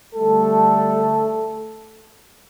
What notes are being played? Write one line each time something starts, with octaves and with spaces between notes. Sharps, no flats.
D3 G3 A3 A4